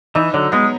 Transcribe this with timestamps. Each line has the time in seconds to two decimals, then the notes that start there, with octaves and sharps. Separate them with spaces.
0.15 E3 D#4
0.34 D3 F#3
0.52 G#3 B3